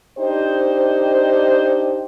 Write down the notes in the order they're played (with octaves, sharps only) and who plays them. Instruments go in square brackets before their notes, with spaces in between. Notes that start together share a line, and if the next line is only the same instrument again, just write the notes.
[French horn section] D4 D#4 G4 C5